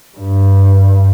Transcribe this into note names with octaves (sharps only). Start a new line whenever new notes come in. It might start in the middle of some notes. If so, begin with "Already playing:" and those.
G2